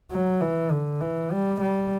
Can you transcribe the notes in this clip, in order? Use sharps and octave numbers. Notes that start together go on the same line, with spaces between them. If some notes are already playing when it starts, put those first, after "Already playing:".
F#3
E3
D3
E3
G3
G3